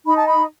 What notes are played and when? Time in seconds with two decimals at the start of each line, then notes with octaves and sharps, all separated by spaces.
0.06 D#4 B5
0.16 A5
0.26 B5